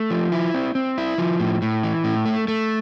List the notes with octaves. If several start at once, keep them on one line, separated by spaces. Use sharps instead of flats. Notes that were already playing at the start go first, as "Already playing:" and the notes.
Already playing: A3
F3
E4
C4
C4
E4
F3
A2
A2
E3
A2
A3
A3